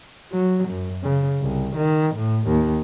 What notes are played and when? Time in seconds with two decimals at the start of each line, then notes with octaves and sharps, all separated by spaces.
0.32 F#3
0.68 F#2
1.03 C#3
1.40 C2
1.76 D#3
2.15 A2
2.47 D#2